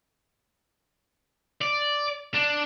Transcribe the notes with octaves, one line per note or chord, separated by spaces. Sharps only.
D5
D4